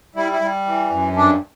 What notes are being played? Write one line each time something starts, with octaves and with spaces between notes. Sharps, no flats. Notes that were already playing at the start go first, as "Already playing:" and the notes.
G3 E4
E4
G3
E3
F#2
G2 D4